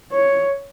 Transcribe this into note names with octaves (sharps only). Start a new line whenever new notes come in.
C#5